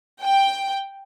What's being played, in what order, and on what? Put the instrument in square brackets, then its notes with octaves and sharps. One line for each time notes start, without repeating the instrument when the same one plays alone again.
[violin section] G5